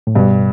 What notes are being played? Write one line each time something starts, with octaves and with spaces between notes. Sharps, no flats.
A2
G2 B2